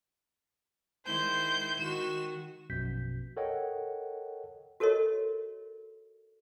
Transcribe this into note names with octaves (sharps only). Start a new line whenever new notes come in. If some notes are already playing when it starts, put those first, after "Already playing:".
D#3 G#3 E4 C5 G6
D#3 F#4 E7
A#1 F#2 B2 G6 B6
A4 A#4 C#5 D#5 F#5 G5
F#4 A4 A#4 C#5 D#5